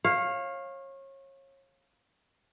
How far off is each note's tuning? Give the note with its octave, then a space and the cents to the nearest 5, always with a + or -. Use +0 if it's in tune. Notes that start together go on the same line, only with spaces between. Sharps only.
C#5 -30 F5 +5